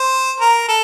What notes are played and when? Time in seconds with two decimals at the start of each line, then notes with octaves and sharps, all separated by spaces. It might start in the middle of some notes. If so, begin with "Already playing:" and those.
Already playing: C5
0.40 A#4
0.68 A4